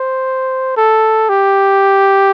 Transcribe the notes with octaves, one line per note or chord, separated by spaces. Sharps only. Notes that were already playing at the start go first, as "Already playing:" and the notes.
Already playing: C5
A4
G4